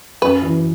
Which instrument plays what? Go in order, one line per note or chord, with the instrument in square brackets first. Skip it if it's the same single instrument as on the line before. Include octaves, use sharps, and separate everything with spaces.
[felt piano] F#2 [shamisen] B4
[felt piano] E3